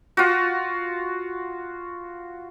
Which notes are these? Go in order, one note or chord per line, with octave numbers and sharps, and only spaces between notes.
F4 F#4